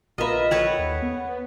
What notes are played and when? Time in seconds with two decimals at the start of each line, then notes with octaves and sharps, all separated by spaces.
0.18 A#1 F4 A#4 B4 D#5 E5
0.51 A4 B4 C#5 F#5 G5
0.79 D#2
1.02 B3